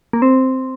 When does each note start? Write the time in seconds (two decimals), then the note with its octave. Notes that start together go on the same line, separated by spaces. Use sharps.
0.13 A#3
0.22 C4